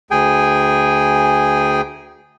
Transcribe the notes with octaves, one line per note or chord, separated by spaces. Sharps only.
D2 G#4 G5 G#5